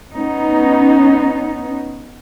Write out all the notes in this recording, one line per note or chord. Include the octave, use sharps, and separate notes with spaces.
B3 C#4 D#4